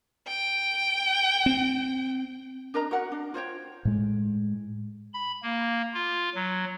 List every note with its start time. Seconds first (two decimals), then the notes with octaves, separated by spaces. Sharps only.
0.27 G5
1.46 C4
2.74 D4 A#4 D#5 A#5
2.91 F#4 A#4 F#5
3.12 D4
3.34 F4 C5 C#5 G5
3.85 A2 G#3
5.14 B5
5.43 A#3
5.94 F4
6.35 F#3